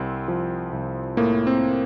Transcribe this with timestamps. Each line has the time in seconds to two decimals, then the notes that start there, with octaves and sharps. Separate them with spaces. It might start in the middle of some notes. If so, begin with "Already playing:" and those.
Already playing: C2 C4
0.28 F3
0.73 C2
1.17 A2 A#3
1.47 C4